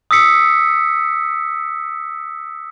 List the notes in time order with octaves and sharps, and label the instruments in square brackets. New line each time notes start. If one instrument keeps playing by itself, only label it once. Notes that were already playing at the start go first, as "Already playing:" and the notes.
[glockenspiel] D#6 E6 B6 C#7